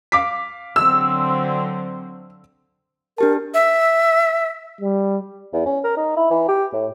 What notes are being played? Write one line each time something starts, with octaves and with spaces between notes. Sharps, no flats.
F5 D6 B6
D3 F#3 C4 E6
D4 G4 A#4 A5
E5
G3
E2
C#4
A#4
D#4
E4
E3
G4
A2